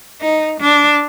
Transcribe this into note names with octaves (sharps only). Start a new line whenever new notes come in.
D#4
D4